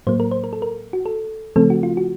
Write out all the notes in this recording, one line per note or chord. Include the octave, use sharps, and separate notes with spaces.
A2 F#3 A#3 C5
A#4
C5
A#4
A4
A#4
F#4
A4
C#3 F3 A3 C4 A4
F#4
F4
F#4